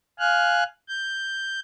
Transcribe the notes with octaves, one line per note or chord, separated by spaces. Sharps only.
F5 G#5 F6 F#6
G6